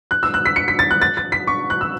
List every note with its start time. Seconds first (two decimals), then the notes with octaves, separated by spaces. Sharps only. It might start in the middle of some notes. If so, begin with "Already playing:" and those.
0.11 F#6
0.23 E6
0.34 F#6
0.46 B6
0.56 C#7
0.68 B6
0.79 A6
0.91 F#6
1.02 A6
1.17 A6
1.32 B6
1.47 C#6
1.70 F#6
1.81 E6